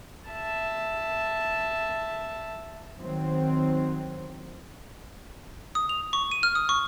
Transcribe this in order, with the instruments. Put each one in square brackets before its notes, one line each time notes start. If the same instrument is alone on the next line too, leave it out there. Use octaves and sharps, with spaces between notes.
[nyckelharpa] E5 A5
[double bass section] D#3 F#3 C4
[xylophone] D#6
F7
C#6
D#7
F6
D#6
C#6